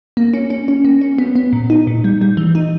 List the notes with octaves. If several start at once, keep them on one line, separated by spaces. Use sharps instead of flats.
A#3
C#4
C#4
C#4
A#3
C#4
B3
B3
A#2
D#4
A#2
G3
G3
E3
D#4